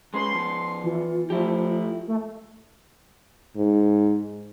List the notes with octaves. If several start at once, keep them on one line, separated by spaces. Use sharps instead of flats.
G#3 C#4 B4 C6
F3 B3
E3 F4
F3 A3 E4 G4
A3
G#2